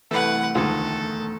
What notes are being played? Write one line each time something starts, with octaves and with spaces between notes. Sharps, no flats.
C2 E3 A3 B4 F#5
E1 D2 D#3 F3 G#3 A4